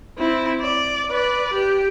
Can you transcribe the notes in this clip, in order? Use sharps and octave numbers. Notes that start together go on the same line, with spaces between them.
C4 E4
D5
B4 D5
G4